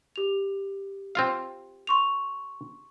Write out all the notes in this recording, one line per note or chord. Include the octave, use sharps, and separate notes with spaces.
G4 F7
C4 F4 F5
C6 C#6 F7